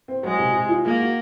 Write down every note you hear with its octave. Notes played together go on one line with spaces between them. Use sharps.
C4
F#3 G#3
C3
C3
F4
G#3 A#3
F#4